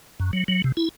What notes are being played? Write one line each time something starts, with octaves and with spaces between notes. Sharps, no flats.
F#2
F#3
F#3
C3
E4